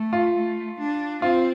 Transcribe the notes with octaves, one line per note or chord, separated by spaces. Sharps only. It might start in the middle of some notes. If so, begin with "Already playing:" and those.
Already playing: A3
F4
A3
D4
C4 F4